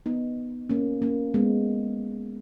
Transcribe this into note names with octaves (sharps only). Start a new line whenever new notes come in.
B3 D#4
A#3 C#4
A#3 C#4
G#3 B3